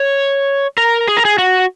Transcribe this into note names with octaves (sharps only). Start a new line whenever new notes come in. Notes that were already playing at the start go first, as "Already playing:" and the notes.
Already playing: C#5
A#4
G#4
A#4
G#4
F#4